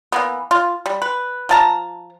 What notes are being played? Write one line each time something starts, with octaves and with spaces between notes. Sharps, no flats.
E3 A#3 B3
F4
G3
B4
F3 A5 A#5